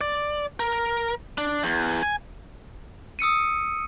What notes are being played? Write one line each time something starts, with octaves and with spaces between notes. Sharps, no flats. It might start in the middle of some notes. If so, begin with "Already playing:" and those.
D5
A#4
D4
E2
G#5
D#6 E6 C#7 D#7